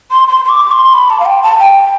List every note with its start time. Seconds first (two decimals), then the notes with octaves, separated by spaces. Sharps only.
0.11 C6
0.28 C6
0.45 C6
0.49 D6
0.72 C6
0.94 B5
1.10 A5
1.20 F5
1.26 G5
1.43 A5
1.59 G5